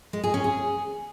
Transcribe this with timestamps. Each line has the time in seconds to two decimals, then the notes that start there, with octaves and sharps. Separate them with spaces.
0.13 G#3
0.23 G#4
0.34 C#4
0.44 G#4